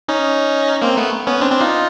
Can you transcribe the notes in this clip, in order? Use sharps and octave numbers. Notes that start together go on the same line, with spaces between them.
C#4 D#4
A#3 C4
A3 B3
B3 C#4
C4 D4
C4 D4
D#4 F4